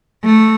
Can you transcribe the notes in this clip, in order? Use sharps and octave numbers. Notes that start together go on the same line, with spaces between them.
A3